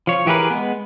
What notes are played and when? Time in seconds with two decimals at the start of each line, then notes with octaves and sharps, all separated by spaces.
0.07 F3 C#5
0.26 E3 G4 G#4 A#4 B4
0.51 G#3 B3